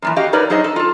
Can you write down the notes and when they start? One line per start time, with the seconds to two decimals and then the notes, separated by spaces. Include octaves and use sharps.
0.02 F#2 A#2 E3
0.16 F#4 G4 D#5 F5
0.33 D#4 A#4 B4 C#5 D5
0.50 F#3 D#4 G#4 C5 D#5
0.64 A4
0.76 F4 A4